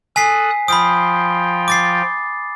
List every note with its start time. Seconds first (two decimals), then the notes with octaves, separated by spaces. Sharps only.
0.16 A4 G#5 D#6 F#6 B6 C7
0.68 F3 F4 G5 B5 D#6
1.68 D6 A6 C7